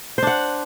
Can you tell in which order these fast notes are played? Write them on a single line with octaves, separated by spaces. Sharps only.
C5 D4 F#5